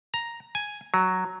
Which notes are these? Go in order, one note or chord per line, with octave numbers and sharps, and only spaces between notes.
A#5
G#5
F#3